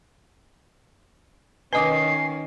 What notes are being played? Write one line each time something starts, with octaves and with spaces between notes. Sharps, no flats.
D#3 C#4 B4 D#5 G#5 D6 D#6 C7